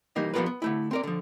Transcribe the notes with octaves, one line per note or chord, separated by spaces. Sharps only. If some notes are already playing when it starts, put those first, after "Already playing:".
E3 G3 A#3 D#4
F3 G3 B3 F4 A#4 B4
B3
D3 A3 E4
C4 A#4 D5
D3 F3